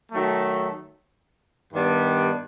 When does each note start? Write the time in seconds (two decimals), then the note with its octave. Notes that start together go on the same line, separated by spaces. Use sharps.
0.12 D#3 F#3 A3
1.74 G2 D#3 G3 B3 D4